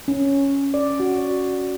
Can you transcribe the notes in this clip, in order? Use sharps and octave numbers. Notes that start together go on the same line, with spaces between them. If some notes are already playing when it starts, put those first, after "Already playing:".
C#4
D5
F#4